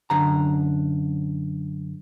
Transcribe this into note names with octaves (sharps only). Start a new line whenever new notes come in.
F#2 D3 A#5